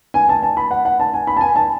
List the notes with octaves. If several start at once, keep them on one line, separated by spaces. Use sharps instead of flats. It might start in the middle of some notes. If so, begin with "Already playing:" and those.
G#5
A5
A5
B5
F#5
F#5
A5
G#5
B5
A5
G#5
A5